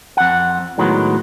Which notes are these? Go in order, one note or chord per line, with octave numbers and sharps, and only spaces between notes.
F2 F#5
A2 D#3 F#3 G#3 B3